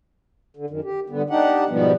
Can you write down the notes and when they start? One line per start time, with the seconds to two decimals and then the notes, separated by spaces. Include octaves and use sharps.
0.57 D3
0.70 F#2 D#3
0.84 G4
1.10 G2 D3 B3
1.30 D4 D#4 G4 F#5
1.69 G#2 B2 F3 G3 B3